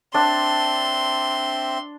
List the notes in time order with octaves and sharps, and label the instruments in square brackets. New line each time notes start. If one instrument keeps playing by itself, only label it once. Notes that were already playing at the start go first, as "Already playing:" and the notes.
[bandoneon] C4 E5 [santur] D4 [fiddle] C6